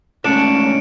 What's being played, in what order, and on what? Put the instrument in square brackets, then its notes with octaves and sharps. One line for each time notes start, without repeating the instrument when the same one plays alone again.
[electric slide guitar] G#2 C#3 A3 [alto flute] C#4 [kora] D4 [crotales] C#7 D7 E7